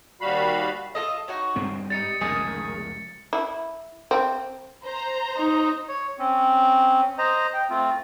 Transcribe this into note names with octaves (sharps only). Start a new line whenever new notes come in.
D#2 G3 F#4 F5 B5
F4 A4 D#5
D#4 F#4 C#5
G2 G#3 C4
G3 D#4 A6 C#7
F1 C#2 F#2 D#3 D#4 G#4
E4
C4
C5 A#5
D#4
C#5
C4 C#4
C5 D#5 A#5
G5
A3 C4 F4